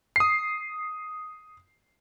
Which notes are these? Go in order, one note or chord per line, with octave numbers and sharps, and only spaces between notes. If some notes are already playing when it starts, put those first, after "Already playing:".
D#6 C7